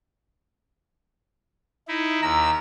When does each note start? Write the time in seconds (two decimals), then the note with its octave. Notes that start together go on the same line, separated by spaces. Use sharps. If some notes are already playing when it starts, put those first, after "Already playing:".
1.88 D#4 E4
2.22 D#2 A#5 E6